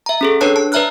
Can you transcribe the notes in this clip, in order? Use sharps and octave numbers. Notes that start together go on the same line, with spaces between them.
E5 A#5
C#4 G#4 A4
D4 B4 C#5 A5 F#6
A5
B4 D5 E5 A#5 F6 F#6